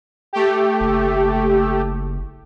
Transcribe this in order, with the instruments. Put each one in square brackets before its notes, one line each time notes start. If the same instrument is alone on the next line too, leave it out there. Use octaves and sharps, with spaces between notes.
[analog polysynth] A3 G4
[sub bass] F#1